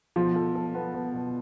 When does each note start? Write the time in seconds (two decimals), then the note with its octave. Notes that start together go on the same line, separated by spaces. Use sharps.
0.16 B2 F3
0.36 A4
0.55 A4
0.75 B3
0.94 B3
1.13 B2